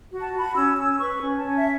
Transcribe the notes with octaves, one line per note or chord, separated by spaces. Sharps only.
F#4
A5
F#4
B5
C#4 E6
C#4 E6
B4 C#6
C#4
A5
C#4
E5